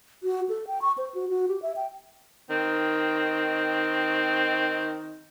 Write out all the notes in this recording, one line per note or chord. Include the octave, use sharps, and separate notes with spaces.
F#4
A4
G5
C#6
C5
F#4
F#4
G4
E5
G5
D#3 C4